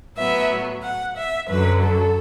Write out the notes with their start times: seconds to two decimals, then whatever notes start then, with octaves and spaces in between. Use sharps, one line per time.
0.16 A2 F#3 B3 E5
0.83 F#5
1.16 E5
1.49 F#2 D3 F#3 B4
1.82 A4